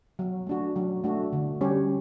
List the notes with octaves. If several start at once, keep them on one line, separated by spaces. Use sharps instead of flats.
F#3
A3 D4 F#4
F#3
A3 D4 F#4
D3
G3 C#4 G4 C#5